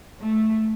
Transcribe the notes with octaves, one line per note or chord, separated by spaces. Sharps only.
A3